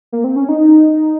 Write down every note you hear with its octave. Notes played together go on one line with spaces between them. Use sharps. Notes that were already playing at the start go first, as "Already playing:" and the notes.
A#3
C4
C#4
D#4